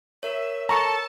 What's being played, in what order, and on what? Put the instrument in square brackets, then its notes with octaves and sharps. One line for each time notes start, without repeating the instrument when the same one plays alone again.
[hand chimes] A#4 C#5 [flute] E5
[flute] A4 [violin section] A5 [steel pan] A#5 C#6